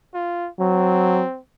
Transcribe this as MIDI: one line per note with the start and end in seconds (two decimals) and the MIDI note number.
0.14 0.49 65
0.60 1.22 54
0.60 1.39 60